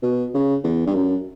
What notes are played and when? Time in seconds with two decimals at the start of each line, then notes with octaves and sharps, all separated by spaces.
0.03 B2
0.34 C#3
0.64 E2
0.86 G2
0.94 F#2